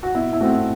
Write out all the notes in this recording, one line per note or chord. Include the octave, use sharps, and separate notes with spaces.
F#4
B2 E4
E4
A3 C4 F#4